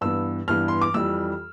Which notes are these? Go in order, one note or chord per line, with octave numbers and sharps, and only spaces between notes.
G2 E3 B3 E6
G2 E3 B3 F6
C6
D6
F2 E3 G3 E6